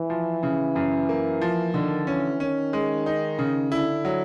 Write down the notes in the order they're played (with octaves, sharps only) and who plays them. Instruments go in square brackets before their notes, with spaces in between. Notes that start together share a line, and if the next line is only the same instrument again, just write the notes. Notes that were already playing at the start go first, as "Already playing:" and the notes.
Already playing: [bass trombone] E3
[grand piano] F3
C#3
F#2
A#3
F3
[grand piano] D3 [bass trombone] D#3
[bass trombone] E3 [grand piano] C#4
[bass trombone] D#3 [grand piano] C#4
[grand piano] G#3
D#4
C#3
[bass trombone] D3 [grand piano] E4
[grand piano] F#3